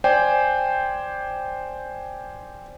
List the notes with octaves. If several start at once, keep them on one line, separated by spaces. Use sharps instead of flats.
C5 D5 G5 G#5